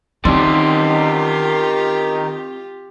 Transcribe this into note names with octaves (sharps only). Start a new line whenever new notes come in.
D#3 E3 C4 F4 G4 D5 C6